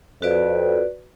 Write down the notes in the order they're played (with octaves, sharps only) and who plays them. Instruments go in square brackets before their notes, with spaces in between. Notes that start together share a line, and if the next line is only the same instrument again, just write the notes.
[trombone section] F2 [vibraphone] F#4 B4 D5